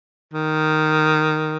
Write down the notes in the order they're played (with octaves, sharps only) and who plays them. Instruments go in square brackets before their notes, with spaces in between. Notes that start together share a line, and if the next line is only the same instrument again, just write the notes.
[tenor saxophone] D#3